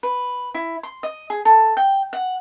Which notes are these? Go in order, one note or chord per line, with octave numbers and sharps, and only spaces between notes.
B4
E4
C6
D#5
G#4
A4
G5
F#5